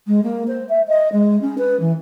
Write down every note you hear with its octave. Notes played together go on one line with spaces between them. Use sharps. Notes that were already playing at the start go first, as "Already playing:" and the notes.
G#3
A#3
C5
E5
D#5
G#3
C#4
B4
E3